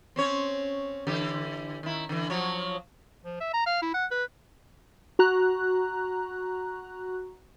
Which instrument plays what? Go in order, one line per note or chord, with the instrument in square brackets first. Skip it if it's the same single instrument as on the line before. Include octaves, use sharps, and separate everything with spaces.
[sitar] C4 C#4 C#5
D3 E3 G4
D#3 E4
D3 E3
F3 F#3 C#5
[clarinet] F3
E5
A#5
F5
E4
F#5
B4
[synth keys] F#4 A#5 F#6